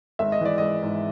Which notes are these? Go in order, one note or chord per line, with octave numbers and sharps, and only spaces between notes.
G#1 E5
D#5
E3 D5
G#1 D#5
G#2